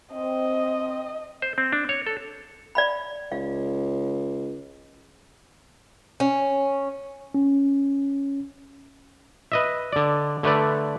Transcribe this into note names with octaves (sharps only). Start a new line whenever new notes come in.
C4 D#5
C5
C4
D4
C#5
A4
D5 F5 B5
C#2 F5
C#4
C#4
B4 D#5 E5
D3 D5
D3 A3 B4 D5